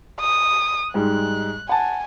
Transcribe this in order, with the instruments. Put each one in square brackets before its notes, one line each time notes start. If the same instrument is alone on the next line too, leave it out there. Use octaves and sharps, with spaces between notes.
[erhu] D#6
[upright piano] G#2 G3 G#3 [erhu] F#6
[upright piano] F#5 A5 [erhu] G#5